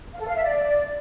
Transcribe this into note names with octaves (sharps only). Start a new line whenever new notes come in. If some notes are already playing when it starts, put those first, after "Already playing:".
F5
A4
F5
E5
D5